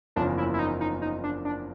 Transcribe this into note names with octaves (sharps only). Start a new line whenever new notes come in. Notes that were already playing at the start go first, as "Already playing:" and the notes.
F#1 E2 C#3 F3 A#3 D4
E4
E4
D#4
D#4
D#4
D4
D4